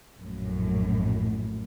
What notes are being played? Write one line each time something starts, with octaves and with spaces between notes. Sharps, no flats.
A#1 F#2 A2